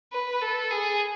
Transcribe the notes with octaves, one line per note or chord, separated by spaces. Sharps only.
B4
A4
G#4